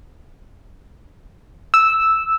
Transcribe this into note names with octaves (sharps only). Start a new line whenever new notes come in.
E6